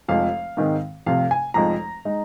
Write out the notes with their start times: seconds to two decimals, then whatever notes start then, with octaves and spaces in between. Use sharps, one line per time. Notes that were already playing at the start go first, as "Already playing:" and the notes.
0.08 F1 F2 F3 G#3 F5
0.57 G#2 D#3 G#3 C4
1.06 F1 F2 C3 F5
1.31 G#5
1.54 F1 F2 F3 G#3 D#4 A#5
2.05 G#3 D#4